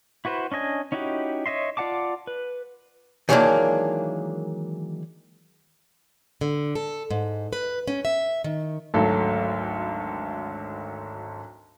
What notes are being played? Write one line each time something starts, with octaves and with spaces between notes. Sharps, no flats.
E4 F#4 B4 C5
C#4 D4 D#5 G#5
C#4 D#4 E4 F#4 G4
C#5 D#5 E5 C6
F4 D5 F#5 A5 D6
B4
D#3 E3 F#3 G#3 A#3 D4
D3
A4
G#2
B4
C#4
E5
D#3
G#1 D2 F#3 A4